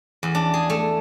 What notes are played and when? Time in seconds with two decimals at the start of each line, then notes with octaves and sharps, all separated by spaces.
0.23 E2
0.35 D4
0.54 G#4
0.70 A3